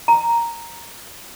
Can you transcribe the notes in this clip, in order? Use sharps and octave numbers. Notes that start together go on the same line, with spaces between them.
A#5